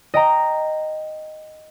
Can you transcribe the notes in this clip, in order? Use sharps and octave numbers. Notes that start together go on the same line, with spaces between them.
D#5 G5 A#5